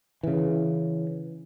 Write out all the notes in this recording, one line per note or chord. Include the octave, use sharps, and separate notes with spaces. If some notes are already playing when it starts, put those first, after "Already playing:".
C#3 E3